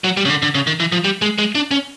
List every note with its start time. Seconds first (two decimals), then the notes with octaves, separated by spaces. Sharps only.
0.04 F#3
0.17 G3
0.25 C#3
0.29 D3
0.42 D3
0.55 C#3
0.67 D#3
0.80 E3
0.92 F3
1.04 G3
1.22 G#3
1.38 G#3
1.55 D4
1.71 C#4